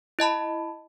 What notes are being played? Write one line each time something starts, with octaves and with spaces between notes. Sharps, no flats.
E4 D#5 A5 B5